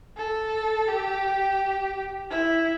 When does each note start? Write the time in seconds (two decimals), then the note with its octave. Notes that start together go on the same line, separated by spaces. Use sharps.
0.17 A4
0.88 G4
2.30 E4